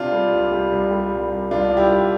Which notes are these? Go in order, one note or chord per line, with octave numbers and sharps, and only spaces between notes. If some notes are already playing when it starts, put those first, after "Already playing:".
Already playing: C3 D4 F4
G3
C2
G3
C2
G3
C2
C2
C2 D4 F4
C2
E4 G4
C2